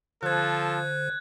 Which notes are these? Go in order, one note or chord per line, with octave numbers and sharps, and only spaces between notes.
D3 F3 A4 C5 F#6 G#6